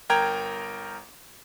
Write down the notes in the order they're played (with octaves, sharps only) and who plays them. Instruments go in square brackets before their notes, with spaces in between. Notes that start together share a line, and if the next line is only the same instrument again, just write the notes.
[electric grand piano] G1 A#4 G5 A#5 G#6